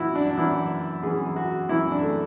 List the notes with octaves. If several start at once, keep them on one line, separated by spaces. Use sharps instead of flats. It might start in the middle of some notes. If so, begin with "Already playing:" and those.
Already playing: F#2 E3 E4 F#4
D4
D4
F#2 E3 E4
F#2 E3 G#4
F#4
F#2 E3 E4
D4
A3